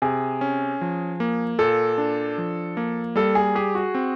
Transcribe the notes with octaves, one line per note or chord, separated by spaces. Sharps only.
C3 G#4
C#4
F3
A#3
A#2 A4
D4
F3
A#3
G3 A4
G#4
G4 G#4
F#4
C4